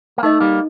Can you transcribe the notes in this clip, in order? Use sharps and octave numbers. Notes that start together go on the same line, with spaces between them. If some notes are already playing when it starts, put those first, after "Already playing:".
A#3
A3 D#4 A4 D#5
G3 A#3